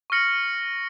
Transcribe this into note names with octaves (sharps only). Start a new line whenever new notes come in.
C#6 F6 A#6 C#7 F#7